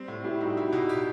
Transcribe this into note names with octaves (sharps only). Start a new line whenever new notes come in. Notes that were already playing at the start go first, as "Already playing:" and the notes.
Already playing: G3 C4
A2
A2 E4 G4
G3 D#4 F#4
E4
B2
G4